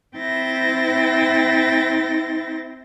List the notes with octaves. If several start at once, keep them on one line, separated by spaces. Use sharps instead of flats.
C4 E4 C5 G5 A6 A#6